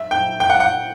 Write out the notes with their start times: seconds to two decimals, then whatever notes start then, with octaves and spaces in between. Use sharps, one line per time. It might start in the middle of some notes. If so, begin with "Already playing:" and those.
Already playing: E5
0.11 G5
0.40 G5
0.50 F#5
0.60 F#5